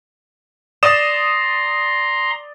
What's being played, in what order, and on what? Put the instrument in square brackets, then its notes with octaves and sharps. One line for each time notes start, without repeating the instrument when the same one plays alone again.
[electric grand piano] D5 D#6 E7 [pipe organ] A#5 C6